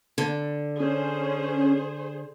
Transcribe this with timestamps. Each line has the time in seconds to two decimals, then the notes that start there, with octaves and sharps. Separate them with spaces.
0.18 D3
0.80 C#4 G#4 C5